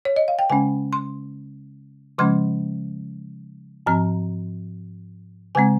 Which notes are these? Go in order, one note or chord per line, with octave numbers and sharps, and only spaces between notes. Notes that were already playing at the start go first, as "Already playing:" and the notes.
C#5
D#5
F5
G5
C#3 G#3 C#4 G#5
C6
C#3 F3 G#3 C#4 C6
G#2 F3 C4 A#5
C#3 G#3 C4 G#5